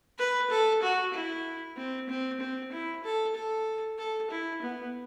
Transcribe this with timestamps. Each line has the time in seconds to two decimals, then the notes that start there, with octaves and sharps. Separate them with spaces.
0.19 B4
0.50 A4
0.82 F#4
1.14 E4
1.77 C4
2.09 C4
2.40 C4
2.72 E4
3.04 A4
3.36 A4
3.98 A4
4.31 E4
4.62 B3